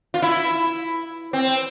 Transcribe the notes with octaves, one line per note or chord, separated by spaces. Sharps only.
F4
E4
C4